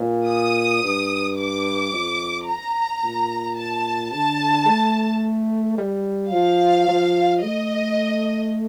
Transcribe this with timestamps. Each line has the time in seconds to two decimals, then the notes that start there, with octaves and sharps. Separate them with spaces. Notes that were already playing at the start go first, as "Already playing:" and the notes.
Already playing: A#2
0.28 D#6
0.84 G2
1.38 D6
1.93 F2
2.49 A#5
3.04 A#2
3.58 A5
4.13 D3 A5
4.67 A3
5.78 G3
6.33 F3 F5
6.88 F3
7.42 A3 D#5